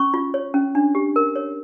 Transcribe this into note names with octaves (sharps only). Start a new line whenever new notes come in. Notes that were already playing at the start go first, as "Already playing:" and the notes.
Already playing: C#4 C#6
F4
C#5
C#4
D4
G4
A#4
C#5